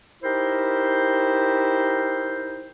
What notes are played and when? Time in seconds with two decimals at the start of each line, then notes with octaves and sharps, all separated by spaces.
0.23 D#4 E4 G4 A#4 C5